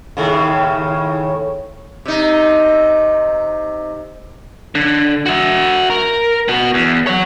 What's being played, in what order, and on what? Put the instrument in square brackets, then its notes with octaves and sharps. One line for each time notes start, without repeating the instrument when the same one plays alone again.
[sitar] D#2 A2 C#3
C3 D#4
[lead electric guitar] D3
F#4 E5
A#4
B3 F#4
E2
C#5 F#5